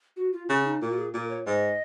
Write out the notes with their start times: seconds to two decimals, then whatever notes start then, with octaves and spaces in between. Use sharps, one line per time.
0.17 F#4
0.33 F4
0.49 C#3 C#4
0.65 D#4
0.81 A#2 F4
0.90 F#4
0.98 G#4
1.14 A#2 A#4
1.29 C#5
1.46 G#2 D#5